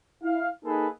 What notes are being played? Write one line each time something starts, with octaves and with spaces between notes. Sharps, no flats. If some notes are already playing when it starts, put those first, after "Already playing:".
E4 F5
A#3 D#4 G#4 A4 B4